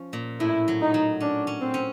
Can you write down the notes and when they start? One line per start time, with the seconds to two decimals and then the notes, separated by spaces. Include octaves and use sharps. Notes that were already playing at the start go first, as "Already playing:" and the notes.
Already playing: F3 C#4
0.13 A#2
0.40 A2 E4
0.68 F#3
0.81 D#4
0.94 F#3
1.20 C#4 D4
1.47 C#4
1.60 C4
1.74 C#4